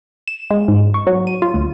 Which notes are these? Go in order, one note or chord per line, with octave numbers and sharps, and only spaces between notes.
E7
G#3
G#2
C#6
F#3
D#7
F4
D2